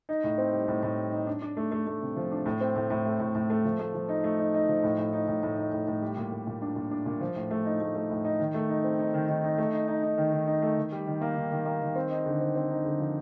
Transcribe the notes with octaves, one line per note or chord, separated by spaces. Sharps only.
D#4
A2
C4
G3
A2
A2
G3
D#4
D4
D4
A3
A3
A3
C3
F3
D4
A2
C4
A2
A2
A3
A2
A2
A3
F3
A3
F3
D#4
A3
D#4
D#4
F3
A2
A2
D#4
A2
A2
D#4
A2
A2
G3
A#2
A#2
A#2
D4
A#2
D4
A#2
F3
A2
A3
D#4
A3
A3
A2
D#4
D#3
A3
D#4
C4
D#4
D#3
D#3
D#4
A3
D#4
D#4
D#4
D#3
D#3
D#4
A3
D#3
G3
D#3
A#3
D#3
D#3
A#3
D#3
C4
D#4
D3
C4
C4
D#4
D3
F3